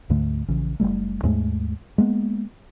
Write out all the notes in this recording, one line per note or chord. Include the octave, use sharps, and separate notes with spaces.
D2 G#2 D3 A3
A#1 C#3 E3
F#1 F2 G3 A3
D#2 G#2 G#3 A3
G#3 A#3 B3